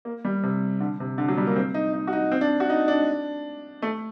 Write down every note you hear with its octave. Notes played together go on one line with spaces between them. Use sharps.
A#3
G3
C3
D3
C3
D3
F#3
G3
A#3
C4
D#4
D#4
F#4
D#4
C4
D4
F#4
D#4
D4
A3